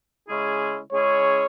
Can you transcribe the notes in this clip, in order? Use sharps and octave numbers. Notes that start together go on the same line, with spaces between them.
C#3 G#3 C#4 E4 G#4
C#3 G#3 C#4 E4 G#4 C#5